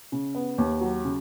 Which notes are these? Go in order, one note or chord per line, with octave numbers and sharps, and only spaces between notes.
C#3
B3
D#2
F#3
C#3